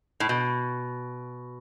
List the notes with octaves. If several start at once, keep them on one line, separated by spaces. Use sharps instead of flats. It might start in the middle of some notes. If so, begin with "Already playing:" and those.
A2
B2